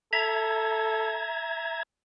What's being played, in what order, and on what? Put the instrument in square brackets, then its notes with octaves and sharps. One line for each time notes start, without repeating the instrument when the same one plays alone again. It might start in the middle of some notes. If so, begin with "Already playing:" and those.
[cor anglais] A4 [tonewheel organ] E5 A#5 G#6